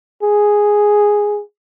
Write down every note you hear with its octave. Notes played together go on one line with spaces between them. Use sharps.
G#4